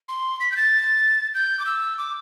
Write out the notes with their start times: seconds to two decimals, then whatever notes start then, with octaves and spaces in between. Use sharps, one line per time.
0.09 C6
0.40 B6
0.52 G6
0.57 A6
1.34 G6
1.59 D6
1.66 E6
1.98 D6